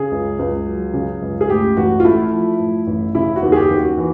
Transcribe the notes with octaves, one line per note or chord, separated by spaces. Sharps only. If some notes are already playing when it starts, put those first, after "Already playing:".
Already playing: C#3 G#4
C#2
C#2
F#3
C#3
C#2
G#4
A2 G4
A1 F#4
F4
A3 E4
F3
A2
A1
C#3 E4
F#4
D#2
G#4
G4
D#2
F#4
E3